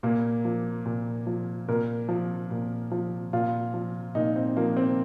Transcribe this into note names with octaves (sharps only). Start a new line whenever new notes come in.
A#2 A#3
F3
A#2
F3
A#2 A#4
F3
A#2
F3
A#2 F4
F3
A#2 D#4
C4
F3 A#3
C4